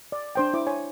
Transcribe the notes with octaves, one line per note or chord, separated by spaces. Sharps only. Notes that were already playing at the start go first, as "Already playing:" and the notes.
D5
D4 C5 G5
E4 C5 D6
C#5 G#5